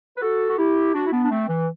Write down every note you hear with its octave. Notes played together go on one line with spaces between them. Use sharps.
B4
F#4 A4
F#4
E4 G4
D4 F#4
E4
B3 D4
D4
A3 C4
E3